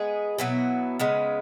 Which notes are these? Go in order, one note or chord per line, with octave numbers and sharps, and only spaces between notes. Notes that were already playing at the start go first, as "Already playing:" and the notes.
Already playing: G#3 B3 G#4
B2 F#3 B3 E4
C#3 G#3 B3